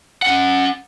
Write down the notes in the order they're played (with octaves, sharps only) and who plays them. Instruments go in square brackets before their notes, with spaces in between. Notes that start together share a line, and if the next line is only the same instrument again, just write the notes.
[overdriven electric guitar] C#4 F#5